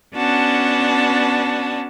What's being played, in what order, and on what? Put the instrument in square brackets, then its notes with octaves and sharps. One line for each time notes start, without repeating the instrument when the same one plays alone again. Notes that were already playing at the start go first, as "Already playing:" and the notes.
[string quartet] B3 C#4 D4 F#4 A5